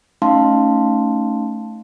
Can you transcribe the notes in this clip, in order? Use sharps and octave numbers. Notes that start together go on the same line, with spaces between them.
A3 C#4 D#4 F5 A5 C6